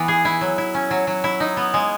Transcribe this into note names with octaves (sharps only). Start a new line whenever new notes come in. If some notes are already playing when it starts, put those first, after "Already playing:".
Already playing: E3 B3
G#4
E4
F#3
E4
C#4
F#3
F#3
E4
D#4
B3
G#3